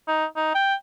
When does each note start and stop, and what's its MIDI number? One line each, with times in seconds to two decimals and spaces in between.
0.08 0.25 63
0.36 0.52 63
0.55 0.75 79